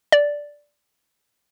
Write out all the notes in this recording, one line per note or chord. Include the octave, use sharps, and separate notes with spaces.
D5